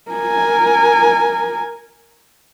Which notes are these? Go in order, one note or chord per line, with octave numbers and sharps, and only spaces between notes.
A#4 G#5